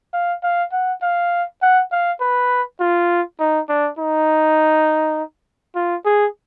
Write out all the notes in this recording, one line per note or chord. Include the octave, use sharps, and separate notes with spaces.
F5
F5
F#5
F5
F#5
F5
B4
F4
D#4
D4
D#4
F4
G#4